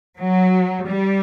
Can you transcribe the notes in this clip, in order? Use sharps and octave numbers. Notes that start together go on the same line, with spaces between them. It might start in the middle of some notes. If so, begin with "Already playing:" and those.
F#3
G3